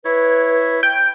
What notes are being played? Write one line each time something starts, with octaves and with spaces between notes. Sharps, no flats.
E4 B4 C#5
G5